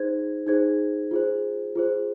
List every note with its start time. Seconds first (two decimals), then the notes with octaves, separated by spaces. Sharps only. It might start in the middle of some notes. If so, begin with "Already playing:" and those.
Already playing: D#4 G#4 C5 G#6
0.47 D#4 G#4 C5 G#6
1.11 F4 G#4 C5
1.75 F4 G#4 C5